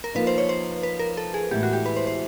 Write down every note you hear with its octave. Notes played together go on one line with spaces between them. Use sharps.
A#4
F3 A#3 D#4 B4
C5
C#5
C5
B4
A#4
A4
G#4
A2 E3 G#3 B3 G4
F#4
G4
B4
C5
C5